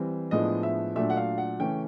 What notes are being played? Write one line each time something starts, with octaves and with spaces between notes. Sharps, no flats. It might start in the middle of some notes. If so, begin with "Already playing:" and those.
Already playing: E3 G3 C4
A2 F3 G#3 B3 D4 D#5
E5
A#2 F#3 A3 D4 E5
F#5
F5
F#5
C#3 E3 A3 C#4 G5